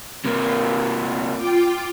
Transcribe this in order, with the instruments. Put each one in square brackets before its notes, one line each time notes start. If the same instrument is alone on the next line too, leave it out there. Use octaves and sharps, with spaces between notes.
[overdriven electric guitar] C3 A#3
[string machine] F4 G5 D6